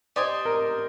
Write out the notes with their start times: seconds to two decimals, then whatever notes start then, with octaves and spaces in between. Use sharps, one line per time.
0.16 G4 C5 D5 D#5 G#5
0.45 A#4